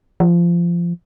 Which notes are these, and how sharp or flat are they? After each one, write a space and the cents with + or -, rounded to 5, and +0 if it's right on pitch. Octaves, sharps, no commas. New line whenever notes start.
F3 -20